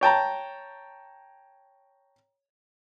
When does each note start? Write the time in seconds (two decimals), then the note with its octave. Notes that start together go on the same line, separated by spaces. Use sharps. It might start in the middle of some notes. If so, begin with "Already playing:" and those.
0.01 C#5 G5 A5 A#5